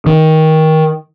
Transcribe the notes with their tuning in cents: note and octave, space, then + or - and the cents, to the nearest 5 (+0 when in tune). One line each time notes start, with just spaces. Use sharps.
D#3 +20